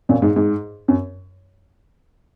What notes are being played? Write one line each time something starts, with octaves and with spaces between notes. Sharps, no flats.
F#2 A#2
G#2
G#2
F#2